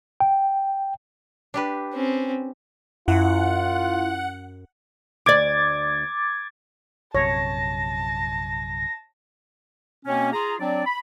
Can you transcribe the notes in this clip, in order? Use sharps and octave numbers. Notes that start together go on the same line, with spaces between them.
G5
D4 G4 B4
C4 C#4
F#2 E4 F4 F#5
D2 D5 D6 G#6 A6
A#1 F#2 C3 C#5 A5 A#6
B2 A#3 C4 C#4
F4 G#4 A#5
F#3 C4 D4 D5
B5